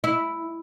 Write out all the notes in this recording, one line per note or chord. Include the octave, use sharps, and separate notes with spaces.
E4